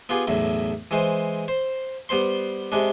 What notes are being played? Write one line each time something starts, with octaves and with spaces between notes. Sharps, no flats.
B3 F4 G4 G#4
B1 E2 A2
E3 G#3 C5
C5
G3 B3 C5 C6
C3 G#3 D4